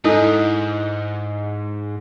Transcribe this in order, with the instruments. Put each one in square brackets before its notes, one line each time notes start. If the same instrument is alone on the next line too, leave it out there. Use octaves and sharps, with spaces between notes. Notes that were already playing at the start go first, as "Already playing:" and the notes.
[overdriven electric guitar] G#2 [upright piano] D#4 [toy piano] E4 A4 G#5